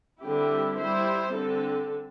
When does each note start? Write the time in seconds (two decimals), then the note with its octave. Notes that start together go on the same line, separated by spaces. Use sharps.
0.21 D3 G3 C4 E4 G4
0.78 G3 E4 C5
1.35 D3 C4 A4